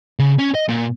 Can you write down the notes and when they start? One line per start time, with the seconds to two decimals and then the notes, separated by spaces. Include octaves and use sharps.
0.19 C#3
0.39 C#4
0.55 D#5
0.69 A#2